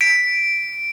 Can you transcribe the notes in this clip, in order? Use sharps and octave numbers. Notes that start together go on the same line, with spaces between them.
B6 D7